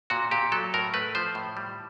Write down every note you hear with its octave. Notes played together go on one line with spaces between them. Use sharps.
A#2 F#4
A#2 G4
F#3 A4
A2 A#4
A3 B4
F3 C5
A2
G3